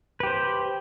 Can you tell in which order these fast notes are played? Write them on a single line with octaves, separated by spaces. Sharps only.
B4 G4 C5